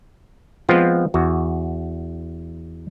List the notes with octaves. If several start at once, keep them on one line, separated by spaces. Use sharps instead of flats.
F3 G#3 B3 C4 F4
E2 F#4